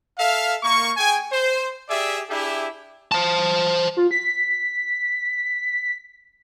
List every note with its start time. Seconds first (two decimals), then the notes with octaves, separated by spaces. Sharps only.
0.18 A4 E5 F5
0.63 A#3 C#6
0.97 G#4 G5 G#5
1.31 C5
1.89 G4 G#4 D5 E5
2.29 D4 E4 G4 G#4 E5
3.12 C5 A5
3.97 F4
4.11 B6